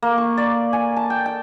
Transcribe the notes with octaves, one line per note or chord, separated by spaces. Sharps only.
A#3
C#6
D5
G#5
A5
G5
G5